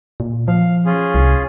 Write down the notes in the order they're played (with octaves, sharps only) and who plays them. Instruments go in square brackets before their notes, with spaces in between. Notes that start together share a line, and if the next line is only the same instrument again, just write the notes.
[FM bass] A#2
[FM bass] F3 [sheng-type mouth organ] F5
[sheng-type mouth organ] C#4 F4 G#4
[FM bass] C2